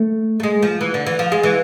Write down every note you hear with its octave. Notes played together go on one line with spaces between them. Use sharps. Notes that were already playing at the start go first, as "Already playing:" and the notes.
Already playing: A3
A3
G#3
F3
E3
D3
E3
F3
G#3
E3